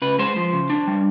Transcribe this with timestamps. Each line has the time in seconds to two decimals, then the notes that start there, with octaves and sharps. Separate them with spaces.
0.02 C#3 B4
0.19 G#3 C5
0.36 F3
0.53 C#3
0.70 D4
0.87 G3